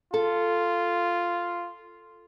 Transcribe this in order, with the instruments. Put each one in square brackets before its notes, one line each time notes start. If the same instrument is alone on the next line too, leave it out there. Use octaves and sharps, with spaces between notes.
[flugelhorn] F4 [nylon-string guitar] A4